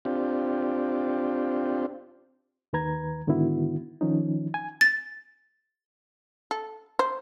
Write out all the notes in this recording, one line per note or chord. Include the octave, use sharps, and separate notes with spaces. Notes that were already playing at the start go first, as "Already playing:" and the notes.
C4 D4 F4 G4
D#2 D#3 B4 A#5 G#6
G#2 D3 D#3 B3 E4 F#4
D#3 F3 C#4 D#4
G#5
A6
A4
C5